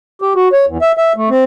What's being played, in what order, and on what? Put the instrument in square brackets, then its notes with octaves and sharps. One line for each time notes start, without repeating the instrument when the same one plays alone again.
[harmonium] G4
F#4
C#5
E2
E5
E5
A3
C4